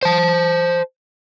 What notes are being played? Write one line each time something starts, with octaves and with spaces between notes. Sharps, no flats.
C5 A5